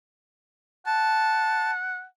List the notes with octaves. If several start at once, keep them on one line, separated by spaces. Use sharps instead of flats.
F#5 A5